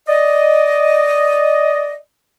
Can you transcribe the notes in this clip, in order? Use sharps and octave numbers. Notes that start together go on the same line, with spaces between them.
D5 D#5